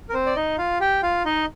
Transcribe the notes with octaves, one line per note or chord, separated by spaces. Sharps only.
A#4
C4 C5
D5
D#4 D#5
F4 F5
G4 G5
F4 F5
D#4 D#5